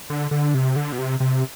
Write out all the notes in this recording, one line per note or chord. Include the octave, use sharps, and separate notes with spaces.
D3
D3
C3
D3
B2
C3
C3